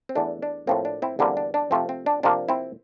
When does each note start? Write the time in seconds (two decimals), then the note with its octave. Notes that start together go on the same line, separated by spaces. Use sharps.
0.09 C4
0.15 E2 E3 A3 D4
0.42 D4
0.67 A2 F3 A#3 C4
0.85 D4
1.02 C4 E4
1.19 E2 D3 G3 A#3 C4
1.37 D4
1.54 D4
1.71 C3 F3 A3 C4
1.89 C4
2.06 D4
2.23 C3 F3 A#3 D4
2.49 C4 E4